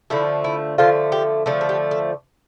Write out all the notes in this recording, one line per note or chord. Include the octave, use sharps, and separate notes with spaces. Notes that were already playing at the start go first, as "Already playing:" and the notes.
D3 F3 A3 E4
E4
D3 F3 A3 F4
G4
D3 F3 A3 A4
A4
G4
A4